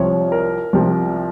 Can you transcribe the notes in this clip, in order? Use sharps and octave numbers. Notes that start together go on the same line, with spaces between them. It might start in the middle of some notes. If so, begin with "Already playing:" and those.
Already playing: C2 C3 F3 C#5
A#4
C2 C3 F3